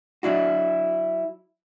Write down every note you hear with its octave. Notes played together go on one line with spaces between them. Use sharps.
F#3 D4 E4 F#4